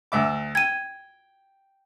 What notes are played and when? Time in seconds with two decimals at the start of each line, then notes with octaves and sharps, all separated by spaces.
0.12 D2 E5 D6
0.55 G5 G#6 D#7